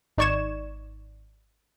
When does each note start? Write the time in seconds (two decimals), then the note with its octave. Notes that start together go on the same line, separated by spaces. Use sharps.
0.18 G#1 D#4 D5 C#6 G#6 E7